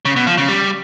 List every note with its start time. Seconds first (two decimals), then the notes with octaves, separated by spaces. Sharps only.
0.05 C#3
0.16 B2
0.27 F3
0.37 C#3
0.48 G3